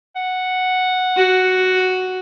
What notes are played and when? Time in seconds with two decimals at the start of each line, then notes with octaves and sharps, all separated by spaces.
0.16 F#5
1.17 F#4